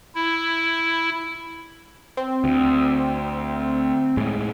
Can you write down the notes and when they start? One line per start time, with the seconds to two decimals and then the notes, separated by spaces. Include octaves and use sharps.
0.15 E4
2.17 C4
2.44 D2
4.17 A2 G#3